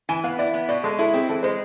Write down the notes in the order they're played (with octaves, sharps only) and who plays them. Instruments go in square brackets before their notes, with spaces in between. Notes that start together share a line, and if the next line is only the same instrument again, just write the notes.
[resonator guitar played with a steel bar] E3 [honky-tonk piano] G#5
[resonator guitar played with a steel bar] B3 [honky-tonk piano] F5
[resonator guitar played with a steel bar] E4 [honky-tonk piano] D5
[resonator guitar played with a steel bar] B3
[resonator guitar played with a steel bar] B2 [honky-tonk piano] D5
[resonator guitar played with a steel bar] G#3 [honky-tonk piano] A4
[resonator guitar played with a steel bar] E4 [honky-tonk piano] A4
[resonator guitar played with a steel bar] C4 [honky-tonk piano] G#4
[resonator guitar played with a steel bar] E3 [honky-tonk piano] A4
[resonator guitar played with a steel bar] G#3 [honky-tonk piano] C5